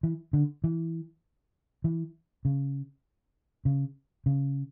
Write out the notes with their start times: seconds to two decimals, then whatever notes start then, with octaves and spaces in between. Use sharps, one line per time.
0.03 E3
0.33 D3
0.64 E3
1.84 E3
2.45 C#3
3.65 C#3
4.26 C#3